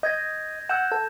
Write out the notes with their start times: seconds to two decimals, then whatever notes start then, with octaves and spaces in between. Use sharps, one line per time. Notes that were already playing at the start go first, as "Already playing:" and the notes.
0.03 D#5 G6 G#6 A#6
0.69 F#5 E6 G6 E7
0.92 A4